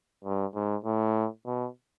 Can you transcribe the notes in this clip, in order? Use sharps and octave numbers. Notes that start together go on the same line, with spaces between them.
G2
G#2
A2
B2